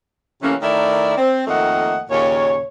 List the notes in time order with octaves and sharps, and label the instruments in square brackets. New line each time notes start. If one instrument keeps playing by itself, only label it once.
[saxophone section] C3 E3 A3 A#3 C#4
D#3 A3 E4 A#4 D5
C4
F2 D#3 A3 A#3 D#5 F#5
D#2 A#2 C#3 C#5